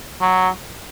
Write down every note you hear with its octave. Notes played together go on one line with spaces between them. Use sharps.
F#3